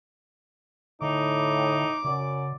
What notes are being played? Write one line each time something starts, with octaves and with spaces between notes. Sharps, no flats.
A2 D3 D#4 D6
F#2 C#3 D5